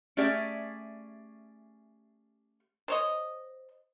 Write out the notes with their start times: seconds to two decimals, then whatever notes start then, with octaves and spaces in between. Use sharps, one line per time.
0.17 A3 C#4 G4 G#4 D5 E5
2.88 C5 C#5 D#5